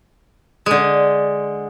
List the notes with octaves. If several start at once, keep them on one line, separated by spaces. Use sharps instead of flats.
D3 G#3